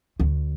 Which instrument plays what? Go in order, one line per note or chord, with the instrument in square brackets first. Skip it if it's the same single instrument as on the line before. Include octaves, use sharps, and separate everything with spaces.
[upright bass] D2